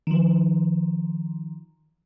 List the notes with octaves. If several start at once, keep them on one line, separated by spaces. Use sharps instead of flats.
D#3 F3